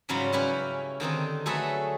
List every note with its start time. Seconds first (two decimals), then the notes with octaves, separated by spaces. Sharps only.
0.09 G#2 C#3 F#3 G3 F4 B5
0.32 C#4 E4 G4 B4
1.00 D3 D#3 C4 D#4
1.46 F#3 A3 G#4 A4 B4 E5